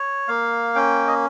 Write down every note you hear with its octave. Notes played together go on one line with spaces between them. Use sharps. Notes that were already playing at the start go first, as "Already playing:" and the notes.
Already playing: C#5
A#3 F5
C#4 G5
D#5